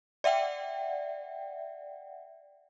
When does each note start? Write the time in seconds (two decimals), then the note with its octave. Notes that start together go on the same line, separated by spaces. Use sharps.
0.24 D5 E5 F#5 G5